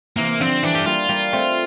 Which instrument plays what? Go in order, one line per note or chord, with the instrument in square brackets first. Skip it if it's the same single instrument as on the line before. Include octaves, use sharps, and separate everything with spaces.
[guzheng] C3 E3 [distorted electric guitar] A#3
[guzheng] D3 F3 [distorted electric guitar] C4
[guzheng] E3 G3 [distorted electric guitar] D4
[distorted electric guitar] G4
[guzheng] G3 A#3 [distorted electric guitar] F4
[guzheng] G3 A#3
A3 C4